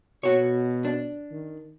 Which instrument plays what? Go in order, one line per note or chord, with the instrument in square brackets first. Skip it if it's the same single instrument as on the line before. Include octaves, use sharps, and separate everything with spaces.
[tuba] B2 [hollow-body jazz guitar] F#4 C#5
[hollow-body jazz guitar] D4
[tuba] D#3